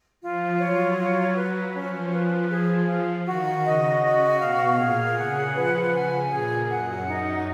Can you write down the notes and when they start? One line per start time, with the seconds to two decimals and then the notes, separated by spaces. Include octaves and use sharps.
0.22 F3 F4
0.60 F#3 C#5
0.98 F4
1.36 B4
1.74 F3 C#4
2.13 B4
2.50 G#4
2.88 F5
3.27 D#3 F#4
3.65 C#3 D#5
4.03 C#3 F#4
4.40 B2 F5
4.79 A#2 G#4
5.17 C#3 F#5
5.54 F3 B4
5.92 C#3 G#5
6.30 A#2 G#4
6.69 F#2 F#5
7.06 F#2 D#4